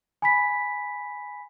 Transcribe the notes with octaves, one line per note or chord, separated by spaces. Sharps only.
G#5 B5 B6